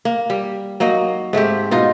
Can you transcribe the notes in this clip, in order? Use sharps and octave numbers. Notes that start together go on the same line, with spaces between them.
A#3
G3
F#3 A#3 D#4 D#5
G#2 A3 C4 G4
B2 D#4 F4